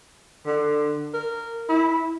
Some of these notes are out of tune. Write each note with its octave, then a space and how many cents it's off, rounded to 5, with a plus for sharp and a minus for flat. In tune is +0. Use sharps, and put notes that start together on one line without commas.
D3 +20
A#4 -15
E4 -10